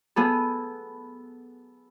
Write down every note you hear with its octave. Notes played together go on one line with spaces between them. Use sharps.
B3 G#4 A4